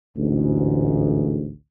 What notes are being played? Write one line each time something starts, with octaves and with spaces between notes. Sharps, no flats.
A1 D2 G#2